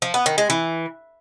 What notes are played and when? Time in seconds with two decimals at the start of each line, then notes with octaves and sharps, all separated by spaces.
0.02 F3
0.14 B3
0.26 D#3
0.38 G#3
0.50 E3